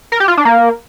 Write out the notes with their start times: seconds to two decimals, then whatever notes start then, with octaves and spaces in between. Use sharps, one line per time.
0.12 A#4
0.20 G4
0.28 F4
0.37 D4
0.45 A#3